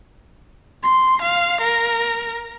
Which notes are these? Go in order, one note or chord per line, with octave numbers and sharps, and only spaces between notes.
C6
F5
A#4